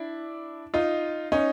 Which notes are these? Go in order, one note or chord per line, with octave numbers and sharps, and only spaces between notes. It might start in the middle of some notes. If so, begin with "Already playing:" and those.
Already playing: D4 E4
D#4 F4
C#4 D#4